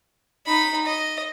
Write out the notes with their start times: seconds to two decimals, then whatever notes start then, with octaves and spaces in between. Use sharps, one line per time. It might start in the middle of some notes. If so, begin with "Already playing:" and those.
0.46 D#4 B5
0.86 D#5